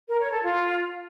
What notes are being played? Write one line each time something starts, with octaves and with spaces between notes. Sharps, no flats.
A#4
C#5
A4
F4